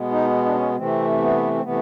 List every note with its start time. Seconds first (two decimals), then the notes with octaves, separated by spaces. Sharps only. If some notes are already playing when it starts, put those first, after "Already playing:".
Already playing: B2 G#3 B3
0.11 D#4
0.45 D4
0.54 C#4
0.76 C3 E3 A3 C4
1.19 B3
1.54 C4
1.62 C3 E3 A3 B3